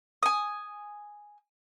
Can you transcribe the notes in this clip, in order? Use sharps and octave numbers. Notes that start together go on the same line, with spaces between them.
G#5 D#6